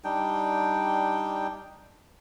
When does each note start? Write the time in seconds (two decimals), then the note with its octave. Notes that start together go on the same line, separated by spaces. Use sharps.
0.04 G3 D4 D#4 G5